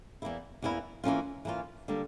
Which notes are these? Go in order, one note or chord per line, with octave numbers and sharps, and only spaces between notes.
E2 E3 A#3 E4
E2 E3 A#3 E4
E3 A#3 C#4 F4
E3 A#3 C#4 F4
D3 G3 A#3